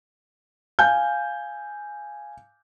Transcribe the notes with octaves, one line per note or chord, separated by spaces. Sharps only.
F5 G#5 G6